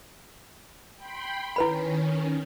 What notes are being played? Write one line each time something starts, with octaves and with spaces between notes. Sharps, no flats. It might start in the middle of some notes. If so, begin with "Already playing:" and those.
G5 B5 C6
D#3 C#4 E4 B4 B5